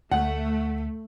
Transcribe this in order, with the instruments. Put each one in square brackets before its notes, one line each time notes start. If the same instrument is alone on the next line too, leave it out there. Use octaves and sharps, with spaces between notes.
[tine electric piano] D2 [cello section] A3 [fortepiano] F#5